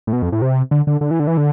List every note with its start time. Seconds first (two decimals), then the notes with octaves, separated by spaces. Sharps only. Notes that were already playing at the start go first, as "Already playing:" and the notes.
0.07 A2
0.13 B2
0.22 F2
0.32 A2
0.42 C3
0.71 D3
0.87 D3
1.01 D3
1.11 E3
1.20 D3
1.27 E3
1.37 D3